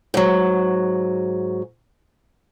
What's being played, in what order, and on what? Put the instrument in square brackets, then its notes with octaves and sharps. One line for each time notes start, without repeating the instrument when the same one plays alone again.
[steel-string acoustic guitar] G#2 F#3